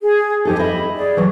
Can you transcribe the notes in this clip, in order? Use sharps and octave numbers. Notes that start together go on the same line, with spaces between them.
G#4
F2 D#4 G4 A4
D#5 E5 B5
G#4 D5
E3 F#3